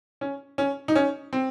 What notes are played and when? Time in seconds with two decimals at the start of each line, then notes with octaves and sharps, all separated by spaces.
0.21 C#4
0.58 C#4
0.88 D#4
0.95 C#4
1.33 C4